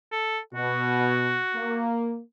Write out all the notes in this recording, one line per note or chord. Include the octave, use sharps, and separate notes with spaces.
A4
B2 F#4
A#3